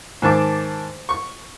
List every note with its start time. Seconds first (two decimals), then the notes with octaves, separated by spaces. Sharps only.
0.22 G#2 D#3 A5 D6
1.09 C#6